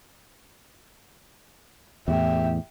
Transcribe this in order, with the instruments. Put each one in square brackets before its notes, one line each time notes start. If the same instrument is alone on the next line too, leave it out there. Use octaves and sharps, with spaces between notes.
[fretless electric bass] E2 A2 [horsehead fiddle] G4 E5